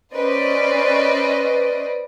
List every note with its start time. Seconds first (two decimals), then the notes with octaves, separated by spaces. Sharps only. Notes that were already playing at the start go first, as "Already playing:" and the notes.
0.13 C#4 B4 C5 D5 D#5